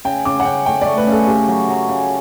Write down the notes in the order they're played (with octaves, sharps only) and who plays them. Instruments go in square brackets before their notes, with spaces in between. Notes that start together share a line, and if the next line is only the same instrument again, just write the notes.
[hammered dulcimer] C#3 [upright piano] G5
[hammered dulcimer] C#3 [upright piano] D6
[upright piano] F#5
[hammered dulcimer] C#3 [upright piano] G5
[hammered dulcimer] A3 [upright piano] G5
[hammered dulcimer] A3 [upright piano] D5
[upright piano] B4
[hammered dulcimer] C#3
[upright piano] A4
[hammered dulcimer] C#3 [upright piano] G4
[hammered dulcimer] F#3
F#3
C#3